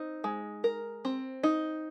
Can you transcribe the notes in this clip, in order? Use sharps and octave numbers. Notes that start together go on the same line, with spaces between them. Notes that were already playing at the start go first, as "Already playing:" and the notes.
Already playing: C4 D#4
G#3
A#4
C4
D#4